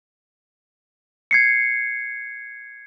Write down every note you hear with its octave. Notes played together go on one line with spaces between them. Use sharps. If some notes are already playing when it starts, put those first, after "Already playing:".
G#6 C7 C#7